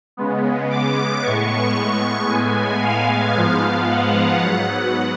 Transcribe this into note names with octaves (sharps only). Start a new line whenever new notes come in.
C#3 G#3 B3
D6
A2 G#3 B3 C#6
C#6
A2 G#3 B3 G#5
F5
G#2 F3 G#3 B3
F#5
G#2 F#3 B3